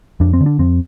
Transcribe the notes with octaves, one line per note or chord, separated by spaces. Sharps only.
F2 D4
C4
D3
D4
F2 C4